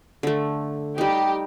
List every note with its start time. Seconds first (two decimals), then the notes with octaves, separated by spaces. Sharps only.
0.23 D3 A3
0.98 G3 D#4 G4